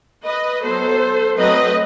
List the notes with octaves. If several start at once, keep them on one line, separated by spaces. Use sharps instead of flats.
B4 D#5
F#3 B3 A4 C5
F#3 A3 C4 B4 D#5